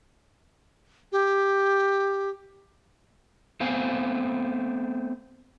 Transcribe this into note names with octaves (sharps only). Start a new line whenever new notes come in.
G4
A3 B3 C4 C5 F5 G#5